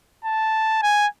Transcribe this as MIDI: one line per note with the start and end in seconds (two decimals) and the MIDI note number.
0.25 0.80 81
0.83 1.06 80